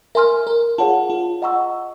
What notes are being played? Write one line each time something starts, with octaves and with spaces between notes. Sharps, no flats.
A#4 E5 G#5 C6 F6
A#4
F4 G#4 C#5 F#5 A5
F4
D#5 F#5 A#5 C#6 E6